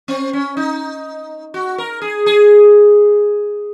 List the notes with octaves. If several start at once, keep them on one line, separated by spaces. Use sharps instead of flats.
C4
C#4
D#4
F#4
A#4
G#4
G#4